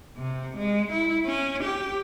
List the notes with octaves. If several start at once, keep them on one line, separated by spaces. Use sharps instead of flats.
C3
G#3
E4
C#4
G4